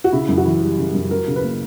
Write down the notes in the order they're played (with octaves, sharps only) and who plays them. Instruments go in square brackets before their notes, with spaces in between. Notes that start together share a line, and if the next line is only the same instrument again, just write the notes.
[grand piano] F#4
C#3 E4
F#2
F#4
E3
G3
C#3
F#2
F#3 A#4
C#3
B4
A#3